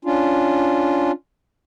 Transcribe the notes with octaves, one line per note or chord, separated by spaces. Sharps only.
C#4 D4 F4